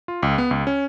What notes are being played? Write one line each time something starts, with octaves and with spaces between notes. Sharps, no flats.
F4
C#2
B3
C#2
C#4